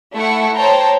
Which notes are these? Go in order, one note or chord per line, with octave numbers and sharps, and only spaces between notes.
A3 E4 F#5 C#6
C5 C#5 G5 A5 A#5